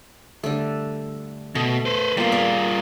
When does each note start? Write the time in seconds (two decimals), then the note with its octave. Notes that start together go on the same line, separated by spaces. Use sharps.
0.43 D3 G3 A3
1.55 B2 A3
1.86 B4 C5
2.17 G3 A#3 B3 F4
2.32 G#4 A#4 D5